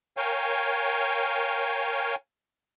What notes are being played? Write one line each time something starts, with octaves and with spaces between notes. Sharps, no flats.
A#4 C#5 F5 G5 G#5